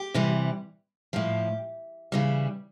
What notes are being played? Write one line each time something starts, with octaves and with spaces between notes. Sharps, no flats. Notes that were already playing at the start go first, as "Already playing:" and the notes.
Already playing: G4
C3 E3 G3
A2 F3 G4
C#3 E3 G3